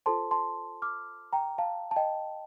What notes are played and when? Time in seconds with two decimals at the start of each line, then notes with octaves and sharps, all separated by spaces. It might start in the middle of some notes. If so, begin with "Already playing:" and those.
0.06 F4 A4 C5 A5 C6
0.31 A5 C6
0.82 D6 F6
1.33 G5 A#5
1.58 F5 A5
1.91 A5
1.96 D#5 G5